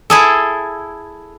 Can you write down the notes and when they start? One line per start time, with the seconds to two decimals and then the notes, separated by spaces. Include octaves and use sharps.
0.10 E4 G#4 A4